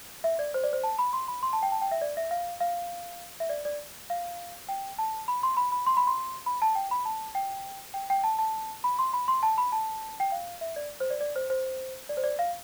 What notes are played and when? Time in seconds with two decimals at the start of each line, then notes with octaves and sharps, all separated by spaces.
0.24 E5
0.39 D5
0.54 C5
0.64 D5
0.73 C5
0.83 A5
0.99 B5
1.13 C6
1.28 B5
1.43 C6
1.53 A5
1.62 G5
1.72 A5
1.82 G5
1.91 E5
2.01 D5
2.17 E5
2.31 F5
2.61 F5
3.40 E5
3.49 D5
3.65 D5
4.10 F5
4.69 G5
4.98 A5
5.28 B5
5.43 C6
5.57 B5
5.72 B5
5.86 C6
5.97 B5
6.07 C6
6.46 B5
6.62 A5
6.75 G5
6.91 B5
7.05 A5
7.35 G5
7.94 G5
8.10 G5
8.24 A5
8.39 A5
8.84 B5
8.99 C6
9.13 B5
9.28 C6
9.43 A5
9.58 B5
9.72 A5
10.20 G5
10.32 F5
10.61 E5
10.76 D5
11.00 C5
11.10 D5
11.21 D5
11.36 C5
11.50 C5
12.09 D5
12.17 C5
12.24 D5
12.39 F5